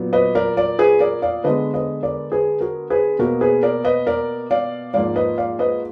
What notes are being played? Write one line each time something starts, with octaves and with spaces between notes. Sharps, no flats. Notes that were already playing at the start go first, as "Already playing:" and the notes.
Already playing: A#2 F#3 B3
B4 D#5
A#4 D5
A#4 D5
G#4 B4
A#4 D5
D5 F5
D3 G#3 B3 B4 D#5
B4 D#5
A#4 D5
G#4 B4
F#4 A#4
G#4 B4
B2 A#3 F#4 A#4
G#4 B4
A#4 D5
B4 D#5
A#4 D5
D5 F5
G#2 F3 A#3 D5 F5
B4 D#5
D5 F5
B4 D#5